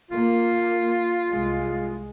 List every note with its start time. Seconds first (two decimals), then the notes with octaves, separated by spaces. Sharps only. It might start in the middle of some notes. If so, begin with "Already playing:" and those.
0.11 A#3 F4
1.29 C2 G#3